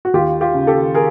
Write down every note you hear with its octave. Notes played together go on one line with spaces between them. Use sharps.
F#4
D#2 F4 G4
F4 G4
C#3
G4 A4
G#4 A#4